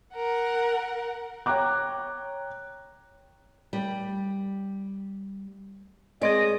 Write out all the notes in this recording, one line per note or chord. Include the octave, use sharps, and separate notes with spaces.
A#4 F#5
C#5 G5 A#5 D6 F#6
G3
G#3 C4 G#4 D5 D#5